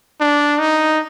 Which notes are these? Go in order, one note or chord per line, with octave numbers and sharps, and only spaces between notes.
D4
D#4